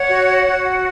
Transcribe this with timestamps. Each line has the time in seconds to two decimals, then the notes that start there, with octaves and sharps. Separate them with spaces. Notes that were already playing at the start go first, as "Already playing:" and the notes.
Already playing: C#5 F#5
0.09 F#4
0.46 F#4